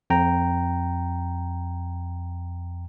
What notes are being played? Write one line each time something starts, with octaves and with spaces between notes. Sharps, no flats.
F2 G5 A#5